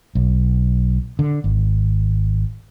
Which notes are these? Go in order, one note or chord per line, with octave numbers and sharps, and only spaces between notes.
B1
D3
G#1